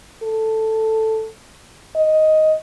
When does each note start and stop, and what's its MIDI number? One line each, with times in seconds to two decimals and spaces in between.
0.23 1.29 69
1.96 2.55 75